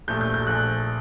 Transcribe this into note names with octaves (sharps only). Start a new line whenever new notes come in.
A#1 A#2 A3 G6
G6
G6
A#1 A#2 A3 F#6